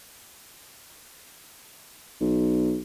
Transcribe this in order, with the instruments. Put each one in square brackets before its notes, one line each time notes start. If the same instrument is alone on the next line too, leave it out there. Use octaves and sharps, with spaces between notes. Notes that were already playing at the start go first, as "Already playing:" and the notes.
[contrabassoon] B1